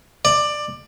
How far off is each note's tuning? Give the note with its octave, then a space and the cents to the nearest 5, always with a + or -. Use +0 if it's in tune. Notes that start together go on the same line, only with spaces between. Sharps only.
D5 +15